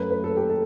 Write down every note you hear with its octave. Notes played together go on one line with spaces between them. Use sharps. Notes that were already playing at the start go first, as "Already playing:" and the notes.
Already playing: F#2 F#3 A3 B4
B4
A4
G4
A4